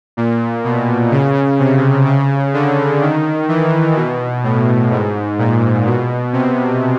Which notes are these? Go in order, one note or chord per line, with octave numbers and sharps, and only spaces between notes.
A#2
B2
C#3
C3
C#3
D3
D#3
E3
B2
A2
G#2
A#2
B2
C3